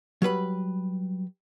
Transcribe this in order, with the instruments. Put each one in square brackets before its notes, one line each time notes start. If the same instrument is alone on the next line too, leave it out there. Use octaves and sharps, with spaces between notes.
[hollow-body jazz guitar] F#3 G3 B4 B5